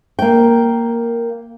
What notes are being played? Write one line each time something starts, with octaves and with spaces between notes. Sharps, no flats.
A#3 G5